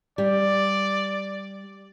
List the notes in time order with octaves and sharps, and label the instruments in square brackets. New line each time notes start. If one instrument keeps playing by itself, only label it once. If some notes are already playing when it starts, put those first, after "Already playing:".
[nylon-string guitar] G3 [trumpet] D5